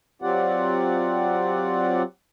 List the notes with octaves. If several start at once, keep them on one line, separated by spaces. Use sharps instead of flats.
F#3 C4 F4 G4 D5 F#5